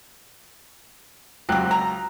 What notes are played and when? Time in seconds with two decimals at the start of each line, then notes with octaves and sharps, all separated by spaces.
1.49 C#2 F#3 C4 G4 F#6
1.71 A#5